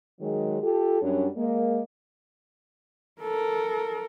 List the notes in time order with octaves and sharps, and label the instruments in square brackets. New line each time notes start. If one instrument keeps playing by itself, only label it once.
[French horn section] D#3 F#3 G#3
F4 G4 A4
F#2 F#3 G3 C#4 D4
G#3 A#3
[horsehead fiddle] A4 A#4